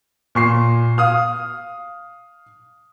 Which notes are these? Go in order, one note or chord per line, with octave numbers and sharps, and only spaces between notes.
A#2 C#6 C7
F5 D#6 F6